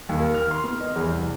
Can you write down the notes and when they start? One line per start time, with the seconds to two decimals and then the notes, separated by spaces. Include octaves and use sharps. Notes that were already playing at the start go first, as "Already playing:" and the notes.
0.09 D#2
0.20 A#4
0.34 F6
0.51 C6
0.64 B3
0.80 D#5
0.96 E2
1.12 C2